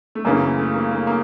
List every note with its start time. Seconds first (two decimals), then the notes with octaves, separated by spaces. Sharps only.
0.15 A3
0.25 F#2 C#3 E3 A#3
0.41 A#3
0.58 A3
0.74 A#3
0.91 A#3
1.07 A#3